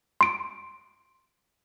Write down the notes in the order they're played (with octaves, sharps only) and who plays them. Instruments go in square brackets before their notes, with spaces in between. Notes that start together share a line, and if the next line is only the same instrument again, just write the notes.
[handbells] C6 D7